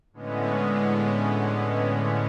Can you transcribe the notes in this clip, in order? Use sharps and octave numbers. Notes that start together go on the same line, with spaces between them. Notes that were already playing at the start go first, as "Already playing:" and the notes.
A2 D3 G#3 B3 C#4